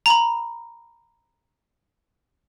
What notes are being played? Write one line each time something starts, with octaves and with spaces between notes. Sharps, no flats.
A#5 B5